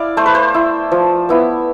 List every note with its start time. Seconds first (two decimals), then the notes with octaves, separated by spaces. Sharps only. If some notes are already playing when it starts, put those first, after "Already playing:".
Already playing: E4 D5 F5
0.17 A3 C5
0.26 B4
0.35 C5
0.54 E4
0.92 F3
1.29 B3 E4